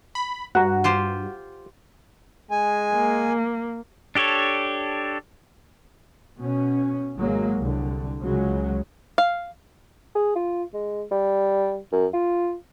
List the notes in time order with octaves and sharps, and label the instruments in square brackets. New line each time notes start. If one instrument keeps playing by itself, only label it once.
[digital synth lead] B5
[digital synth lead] G2 [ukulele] F#4 [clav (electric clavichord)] F#5 A#5
[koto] F4 G4 C5
[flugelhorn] G#3 [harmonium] G#5
[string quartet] A#3
[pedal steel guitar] D4 G4 A4 C#5
[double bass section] B2 C#4
G#1 F#3 G#3 A#3
C2 D3
C#2 C#3 F#3 G#3
[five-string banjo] F5
[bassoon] G#4
F4
G#3
G3
F#2
F4